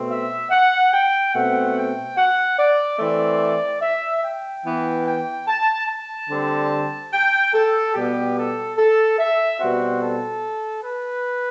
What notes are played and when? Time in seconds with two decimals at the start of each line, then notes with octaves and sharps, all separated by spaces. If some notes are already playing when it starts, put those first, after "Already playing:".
Already playing: B2 A3 C4
0.10 E5
0.51 F#5
0.93 G5
1.33 B2 A3 C4 F#5
1.76 G5
2.17 F#5
2.58 D5
2.99 E3 A3 C4 D5
3.82 E5
4.23 G5
4.64 E3 B3
5.05 G5
5.47 A5
5.88 A5
6.29 D3 G3 C4
7.12 G5
7.54 A4
7.94 B2 G3 B3 G4
8.36 A4
8.77 A4
9.19 E5
9.59 B2 G3 C4 F#4
10.01 A4
10.84 B4